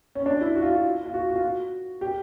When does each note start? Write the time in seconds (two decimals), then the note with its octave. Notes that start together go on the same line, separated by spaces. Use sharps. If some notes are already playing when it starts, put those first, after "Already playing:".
0.15 C#4
0.26 D4
0.41 E4
0.56 F#4
0.62 F4
0.70 F#4
1.06 F4
1.14 F#4
1.29 F#4
1.36 F4
1.43 F#4
2.01 G4